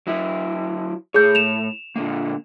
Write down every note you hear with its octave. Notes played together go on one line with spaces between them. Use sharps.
F#3 E4
A2 G#4 C#5 G6
E7 F7
A#2 D3 A#3